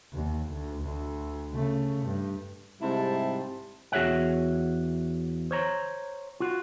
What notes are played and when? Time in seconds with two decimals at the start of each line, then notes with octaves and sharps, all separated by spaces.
0.13 D#2
0.51 D2
0.83 D2
1.54 C#3 A3
2.05 G2
2.81 G#2 C3 G3 E4 A5 C6
3.92 E2 F#4 G#4 C#5 E5 F#5
5.51 C5 C#5 A#5
6.40 F4 F#4